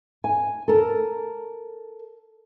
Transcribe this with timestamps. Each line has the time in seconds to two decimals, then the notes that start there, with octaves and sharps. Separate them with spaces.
0.24 G#5
0.68 A4 A#4